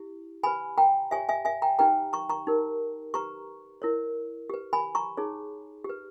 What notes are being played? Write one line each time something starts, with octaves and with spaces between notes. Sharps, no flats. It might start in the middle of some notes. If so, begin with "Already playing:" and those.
Already playing: E4 G4
G4 B4 G#5 B5
G5 A#5
G4 C#5 E5 G#5
E5 G#5
E5 G#5
G5 A#5
D#4 G4 B4 G5 A#5
A#5 C#6
A#5 C#6
D#4 G4 A#4
G4 B4 A#5 C#6
E4 A#4 C#5
G4 B4
G#5 B5
A#5 C#6
D#4 G#4 C#5
G4
B4